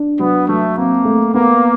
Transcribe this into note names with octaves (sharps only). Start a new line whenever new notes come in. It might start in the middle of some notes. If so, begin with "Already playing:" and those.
Already playing: D4
F#3 B3
F#3 A3
A#3 C4
A3
A#3 B3